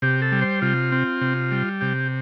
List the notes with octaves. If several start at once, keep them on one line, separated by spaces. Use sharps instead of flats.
C3 G4
A4
G3
C5
C3 F4
C4
C3
G3
C3 G4